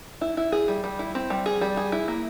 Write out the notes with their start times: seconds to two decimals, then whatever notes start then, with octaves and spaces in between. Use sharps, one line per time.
0.21 E4
0.37 E4
0.52 G#4
0.68 G3
0.84 G3
0.99 E4
1.15 C4
1.30 G3
1.46 G#4
1.61 G3
1.77 G#4
1.92 E4
2.08 A#3